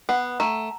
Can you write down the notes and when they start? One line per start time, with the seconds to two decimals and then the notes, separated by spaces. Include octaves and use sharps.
0.09 B3 F#5
0.40 A3 A#5